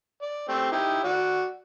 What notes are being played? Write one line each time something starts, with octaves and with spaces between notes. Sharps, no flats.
D5
A3 C4 G4
D#4 E4 G4
F#4 D5